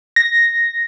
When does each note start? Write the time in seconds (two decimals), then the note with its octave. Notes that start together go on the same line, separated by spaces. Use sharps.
0.16 A#6